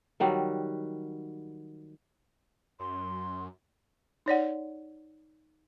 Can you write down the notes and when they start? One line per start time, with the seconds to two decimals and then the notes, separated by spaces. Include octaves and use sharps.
0.20 D#3 F#3 G3
2.80 F#2 C6
4.26 D#4 C#5 D5 F#5